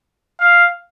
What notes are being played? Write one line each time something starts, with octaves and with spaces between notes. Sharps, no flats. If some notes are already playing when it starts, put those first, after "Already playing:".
F5